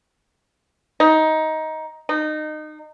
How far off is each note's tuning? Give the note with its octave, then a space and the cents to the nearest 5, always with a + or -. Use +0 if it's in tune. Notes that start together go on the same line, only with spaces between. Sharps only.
D#4 +15
D#4 -25